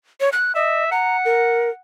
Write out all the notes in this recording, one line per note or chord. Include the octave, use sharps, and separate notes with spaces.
C#5
F#6
D#5 E5
F#5 A#5
A#4